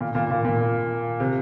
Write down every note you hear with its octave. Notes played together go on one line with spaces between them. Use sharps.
A#2
A#2
A#2
A#2
C3